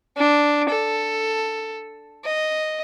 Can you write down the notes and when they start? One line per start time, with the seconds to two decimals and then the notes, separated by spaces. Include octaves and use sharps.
0.17 D4
0.70 A4
2.25 D#5